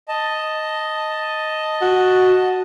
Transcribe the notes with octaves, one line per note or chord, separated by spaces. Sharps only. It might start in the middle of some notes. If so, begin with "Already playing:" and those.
D#5 A5
F#4